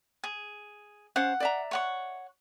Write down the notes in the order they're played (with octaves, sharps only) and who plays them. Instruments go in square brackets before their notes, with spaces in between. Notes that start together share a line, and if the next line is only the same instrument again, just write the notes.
[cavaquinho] G#4
[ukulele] C#4 C5 F5 [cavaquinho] F#5
[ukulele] D5 E5 A#5
[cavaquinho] C#5 F#5 C#6